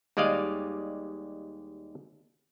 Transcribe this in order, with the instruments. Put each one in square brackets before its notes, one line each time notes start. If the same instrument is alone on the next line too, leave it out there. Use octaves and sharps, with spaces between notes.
[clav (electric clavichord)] D#2 G3 G#3 D5 D#5 F5